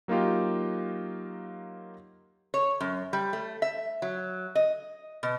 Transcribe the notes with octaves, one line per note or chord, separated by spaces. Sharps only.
F#3 A#3 D#4 F4 G4
C#5
F#2
G3
A3
E5
F#3
D#5
B2